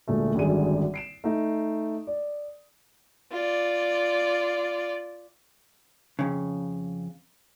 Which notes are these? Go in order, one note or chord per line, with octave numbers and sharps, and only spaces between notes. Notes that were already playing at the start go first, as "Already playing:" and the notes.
D2 A#2 G#3 A3
G#1 F#2 D3 G3 G#4 D#7
C7 D7 E7
A3 D#4
D5
F4 D5
F2 C#3